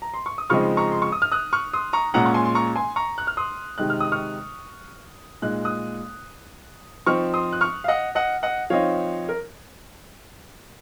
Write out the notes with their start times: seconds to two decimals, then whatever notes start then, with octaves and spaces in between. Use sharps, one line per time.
0.02 A#5
0.14 C6
0.26 C#6
0.38 D#6
0.50 C#3 F3 G#3 C4 D#4 C#6 F6
0.77 A#5 C#6
0.92 C6
1.02 C#6
1.12 D#6
1.22 F6
1.32 D#6 F#6
1.53 C#6 F6
1.73 C6 D#6
1.93 A#5 C#6
2.14 A#2 G#3 C#4 F#5 A#5
2.26 C#6
2.34 G#5 C6
2.45 C6
2.55 A#5 C#6
2.76 G#5 C6
2.96 A#5 C#6
3.18 F#6
3.27 F6
3.37 C6 D#6
3.78 C3 D#3 G#3 D#4 F#6
3.90 F6
4.00 D#6
4.12 C#6 F6
5.42 A#2 G#3 D#4 F#6
5.65 D#6 F#6
7.06 F3 C4 D#4 C#6 F6
7.34 C6 D#6
7.53 F#6
7.61 C#6 F6
7.84 F5
7.88 D#5 F#5
8.15 D#5 F#5
8.43 D#5 F#5
8.70 F3 C4 D#4 C#5 F5
9.29 A#4